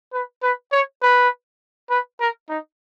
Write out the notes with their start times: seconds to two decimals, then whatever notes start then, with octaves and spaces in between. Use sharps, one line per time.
0.13 B4
0.42 B4
0.72 C#5
1.02 B4
1.90 B4
2.20 A#4
2.49 D#4